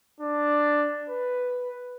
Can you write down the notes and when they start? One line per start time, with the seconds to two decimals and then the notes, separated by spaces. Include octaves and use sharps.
0.20 D4
1.09 B4